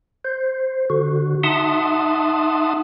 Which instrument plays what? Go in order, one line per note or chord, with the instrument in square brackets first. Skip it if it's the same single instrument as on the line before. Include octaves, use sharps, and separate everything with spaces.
[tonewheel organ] C5
D3 F#4
D#4 E5 F#5 A5 C6 D#6